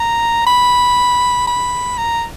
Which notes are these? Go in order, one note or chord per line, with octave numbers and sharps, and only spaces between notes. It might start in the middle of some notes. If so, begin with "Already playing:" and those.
Already playing: A#5
B5
B5
A#5